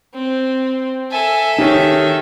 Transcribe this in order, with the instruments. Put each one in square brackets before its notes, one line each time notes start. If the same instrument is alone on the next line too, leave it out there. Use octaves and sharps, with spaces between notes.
[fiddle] C4
[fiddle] A4 E5 [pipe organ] G#5
[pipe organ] D#3 [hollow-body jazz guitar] D#4 G4 C#5